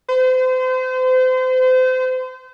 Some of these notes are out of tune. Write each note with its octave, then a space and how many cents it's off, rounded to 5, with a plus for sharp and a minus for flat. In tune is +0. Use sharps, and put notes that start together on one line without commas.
C5 -35